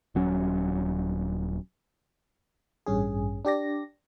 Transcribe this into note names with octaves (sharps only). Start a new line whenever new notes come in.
D#1 F#3 C#4
A1 G2 C#4 G#4
D4 G4 D5 A#6